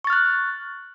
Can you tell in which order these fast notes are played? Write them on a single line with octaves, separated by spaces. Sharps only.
C#6 A6 F6 F#6